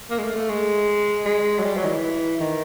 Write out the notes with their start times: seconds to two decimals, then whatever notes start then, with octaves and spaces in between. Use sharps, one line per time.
0.10 A#3
0.19 G#3
0.23 A3
0.36 A3
0.49 G#3
1.25 G#3
1.59 F#3
1.63 G3
1.77 F#3
1.84 D#3
1.89 E3
2.40 D#3